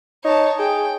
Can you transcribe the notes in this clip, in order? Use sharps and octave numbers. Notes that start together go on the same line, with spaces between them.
D#4 C#5 A5
G#4 G5